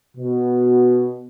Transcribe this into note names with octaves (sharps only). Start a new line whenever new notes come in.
B2